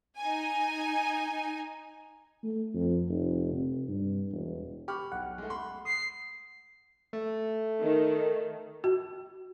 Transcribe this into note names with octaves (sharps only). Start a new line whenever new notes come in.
D#4 G#5
A3
F2
F1
C3
G2
E1
G4 B5 C#6 F6
B1 F#5
G#3 A3
B5 C6
D#6 C7
A3
D#3
F#4